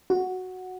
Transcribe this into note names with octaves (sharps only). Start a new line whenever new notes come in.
F#4